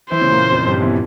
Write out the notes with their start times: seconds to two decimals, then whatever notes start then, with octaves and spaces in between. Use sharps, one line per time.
0.11 E3 E4 C5
0.21 C#3 C#4
0.31 A#2 A#3
0.52 F2 F3
0.66 G2 G3
0.81 E2 E3